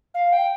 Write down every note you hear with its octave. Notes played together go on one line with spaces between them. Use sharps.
F5
G5